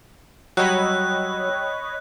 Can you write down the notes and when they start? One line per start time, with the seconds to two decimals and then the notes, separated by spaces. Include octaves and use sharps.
0.57 F#3 G3 C#5 D#5 G5 B5 E6 F#6